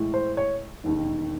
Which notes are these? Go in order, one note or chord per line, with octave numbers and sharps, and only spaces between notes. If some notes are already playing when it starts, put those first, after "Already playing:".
Already playing: A2 E3 G#3
C5
C#5
E1 D#2 D#3